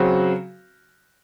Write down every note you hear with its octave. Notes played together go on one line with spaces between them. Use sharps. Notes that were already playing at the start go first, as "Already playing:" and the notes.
Already playing: C#3 F#3 C4 F#4